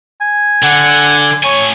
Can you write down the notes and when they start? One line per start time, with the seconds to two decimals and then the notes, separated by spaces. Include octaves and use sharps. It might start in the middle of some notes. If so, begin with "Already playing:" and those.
0.22 G#5
0.63 D3 F#5
1.44 A2 C#5 G#5